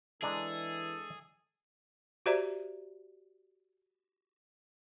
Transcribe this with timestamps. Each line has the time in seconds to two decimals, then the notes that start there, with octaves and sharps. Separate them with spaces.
0.22 E3 G#3 D4 G#4 A4 A#5
2.26 F#4 G4 C5 D5 E5 A#5